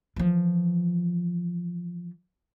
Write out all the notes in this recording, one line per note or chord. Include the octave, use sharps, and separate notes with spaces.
E3 F3